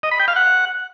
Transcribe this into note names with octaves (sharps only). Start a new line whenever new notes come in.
D#5
B5
G5
F5
F#5